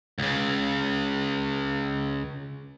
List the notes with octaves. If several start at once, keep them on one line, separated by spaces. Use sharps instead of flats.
C#2 C#3